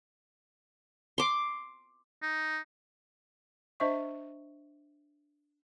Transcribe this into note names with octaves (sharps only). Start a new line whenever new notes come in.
C6 D6
D#4
D4 C5 D#5 E5 C#6